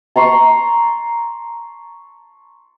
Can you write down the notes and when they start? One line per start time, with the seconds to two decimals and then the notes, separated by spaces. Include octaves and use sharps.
0.16 A5 A#5 C6 C#6